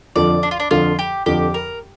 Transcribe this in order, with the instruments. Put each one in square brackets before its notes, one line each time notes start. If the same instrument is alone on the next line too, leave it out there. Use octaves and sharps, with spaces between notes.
[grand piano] F2 D3 F3 [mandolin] D5
[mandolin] D4
F4
D4
[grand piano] F2 D3 F3 [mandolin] F4
[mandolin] G4
[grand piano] F2 D3 F3 [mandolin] G4
[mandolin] A#4